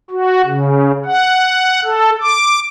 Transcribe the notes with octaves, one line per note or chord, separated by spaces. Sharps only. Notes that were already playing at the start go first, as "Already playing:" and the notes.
F#4
C#3
F#5
A4
D6